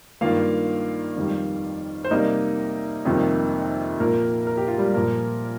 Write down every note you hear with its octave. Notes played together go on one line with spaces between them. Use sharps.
G2 D#3 A#3 F4 F5
F2 D#3 G3
C5
C3 G3 A#3 D#4 D#5
F2 C3 D#3 G3 A#3
A#2 F3 A#3 A#4
A#4
G4
F4
G3 G4
A#2 F3 A#3 A#4